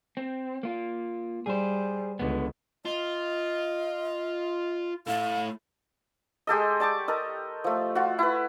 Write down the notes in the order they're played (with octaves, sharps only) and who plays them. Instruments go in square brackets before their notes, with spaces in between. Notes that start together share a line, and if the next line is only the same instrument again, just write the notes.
[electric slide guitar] C4
A#3 F4
[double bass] G3 [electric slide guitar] G#4 C5
[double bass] C#2 [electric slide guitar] D3 G#3 B3
[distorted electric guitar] F4 [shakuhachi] D#5
[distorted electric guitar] A3 E4 [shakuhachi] F5
[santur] G#3 G4 A4 D#5
D5 A5 C#6 D6
A4 A#4 D#5
F3 A3
F4 F#4
E4 B4